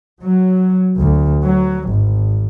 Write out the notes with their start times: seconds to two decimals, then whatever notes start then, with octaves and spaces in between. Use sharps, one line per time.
0.22 F#3
0.99 D2
1.43 F#3
1.88 G#1